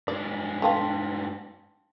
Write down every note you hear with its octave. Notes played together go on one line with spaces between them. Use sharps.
G2 G#3 D5
D3 B3 F4 G5 A5 C6